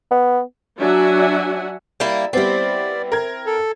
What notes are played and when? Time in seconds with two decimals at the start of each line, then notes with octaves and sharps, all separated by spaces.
0.11 B3
0.78 F#3 D4 F#4 E5 F#5 G#5
2.00 G3 A#3 E4
2.33 G3 B3 C4 E4 D5
3.12 A#4 G#6
3.46 A4